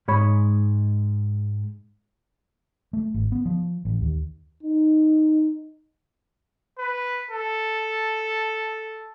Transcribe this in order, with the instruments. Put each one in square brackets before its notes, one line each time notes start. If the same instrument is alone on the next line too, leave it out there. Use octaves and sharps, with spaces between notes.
[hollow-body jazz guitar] G#2 G#3 C#5 B5
[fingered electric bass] A3
G#1
B3
F3
A1
D#2
[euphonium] D#4
[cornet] B4
A4